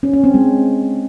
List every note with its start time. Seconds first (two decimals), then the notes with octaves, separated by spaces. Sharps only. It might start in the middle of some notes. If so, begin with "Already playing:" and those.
0.03 C#4
0.13 C#4
0.24 C4
0.34 G#3